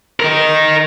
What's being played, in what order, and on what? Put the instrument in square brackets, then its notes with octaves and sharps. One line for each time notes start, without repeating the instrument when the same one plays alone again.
[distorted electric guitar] D#4 A#4